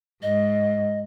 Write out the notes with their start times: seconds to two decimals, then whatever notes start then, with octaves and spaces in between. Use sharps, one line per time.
0.23 G#2 D#5